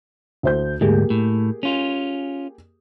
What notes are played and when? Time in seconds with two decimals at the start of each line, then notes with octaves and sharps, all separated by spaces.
0.43 D2 C5 G6
0.81 D2 G#2 A#3 G4 G#4
1.10 A2
1.63 C#4 F4